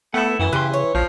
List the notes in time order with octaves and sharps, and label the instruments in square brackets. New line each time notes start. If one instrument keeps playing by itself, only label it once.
[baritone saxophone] A3 [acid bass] B3 [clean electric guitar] E4 F#5
[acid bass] F#2 [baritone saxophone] E3
[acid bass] C#3 [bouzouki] G4 [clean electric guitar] B4 C6
[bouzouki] C#5
[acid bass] A#1 [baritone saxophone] F3